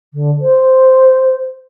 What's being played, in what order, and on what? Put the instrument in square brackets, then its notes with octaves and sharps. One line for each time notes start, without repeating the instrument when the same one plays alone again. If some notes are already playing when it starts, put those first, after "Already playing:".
[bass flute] D3
C5